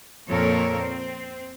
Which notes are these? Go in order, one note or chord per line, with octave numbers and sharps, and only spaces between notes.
F2 A#2 A#3 A4 A#4 C#5
C4